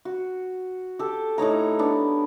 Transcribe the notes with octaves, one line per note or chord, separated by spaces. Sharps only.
F#4
G4 A4
A2 D#4 C#5 A#5
B3 D4